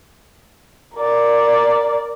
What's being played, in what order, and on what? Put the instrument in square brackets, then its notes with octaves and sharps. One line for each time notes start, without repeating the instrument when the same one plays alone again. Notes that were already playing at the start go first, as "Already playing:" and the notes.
[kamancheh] A#4 D5